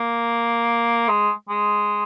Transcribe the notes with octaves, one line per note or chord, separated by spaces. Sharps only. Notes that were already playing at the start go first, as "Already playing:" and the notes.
Already playing: A#3
G#3
G#3